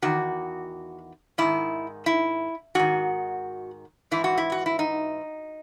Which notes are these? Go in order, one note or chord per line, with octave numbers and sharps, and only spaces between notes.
E2 D#3 F#4
G#2 D#3 E4
E4
G#2 D#3 F#4
G#2 E3 E4
F#4
E4
F#4
E4
D#4